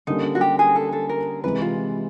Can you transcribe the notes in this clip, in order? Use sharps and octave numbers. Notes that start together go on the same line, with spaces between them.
D3 G3 A#3 C#4 D#4
F#4
G4
G#4
A4
A4
A#4
C3 E3 G#3 B4
F4